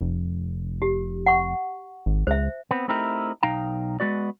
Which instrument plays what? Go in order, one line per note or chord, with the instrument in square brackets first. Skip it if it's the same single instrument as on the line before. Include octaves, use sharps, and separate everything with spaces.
[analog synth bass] F1
[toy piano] G4
F#5 C#6
[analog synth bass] G#1
[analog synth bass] C#2 [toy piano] C5 E5
[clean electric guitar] B3 C4
A3 C4 D#4 E4 G4 A#4
B1 D#4 F5 G5 A#5
G#3 B3 F#4 D5